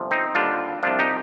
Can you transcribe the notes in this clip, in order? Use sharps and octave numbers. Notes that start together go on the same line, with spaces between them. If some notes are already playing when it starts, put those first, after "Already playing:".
Already playing: G1 C3 F3
C4 D#4
D#2 D3 G3 D4 F4
C2 C3 F3 D4 F4
D#4 G4